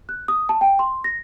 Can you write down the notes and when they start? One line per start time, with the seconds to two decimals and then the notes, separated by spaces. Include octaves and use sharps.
0.09 F#6
0.28 D#6
0.49 A5
0.61 G5
0.79 C6
1.04 A#6